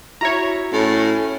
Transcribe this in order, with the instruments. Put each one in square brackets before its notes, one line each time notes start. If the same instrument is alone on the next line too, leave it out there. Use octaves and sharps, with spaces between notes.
[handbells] E4 F#4 E5 [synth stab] C#5 A#5
[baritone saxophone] A2 [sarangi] C#4